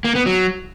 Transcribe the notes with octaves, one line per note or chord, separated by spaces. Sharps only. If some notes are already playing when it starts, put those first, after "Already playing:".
A#3
B3
F#3